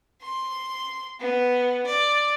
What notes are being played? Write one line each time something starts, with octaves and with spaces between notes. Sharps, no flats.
C6
B3
D5